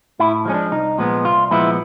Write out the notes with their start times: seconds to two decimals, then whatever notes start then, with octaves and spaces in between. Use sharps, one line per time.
0.19 A2 E4
0.45 F3 G#3 C#4
0.54 D4
0.71 C2 D#4
0.98 A#2 F3 G#3 B3
1.25 C2 F4
1.51 A#2 F3 G#3 B3 E4